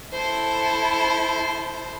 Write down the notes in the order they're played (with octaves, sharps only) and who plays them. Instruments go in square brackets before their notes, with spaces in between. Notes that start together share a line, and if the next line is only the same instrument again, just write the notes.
[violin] E4 A4 [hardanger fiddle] C5